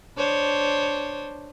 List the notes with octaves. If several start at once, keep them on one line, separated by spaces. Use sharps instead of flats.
D4 C5 C#5